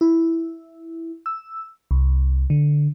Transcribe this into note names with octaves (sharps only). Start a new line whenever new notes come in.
E4
E6
C2
D3